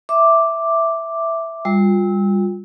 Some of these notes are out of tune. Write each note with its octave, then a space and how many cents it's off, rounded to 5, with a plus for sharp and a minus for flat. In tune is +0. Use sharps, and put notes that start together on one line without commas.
E5 +0 D6 +0
G3 +25 F4 +25 E6 -30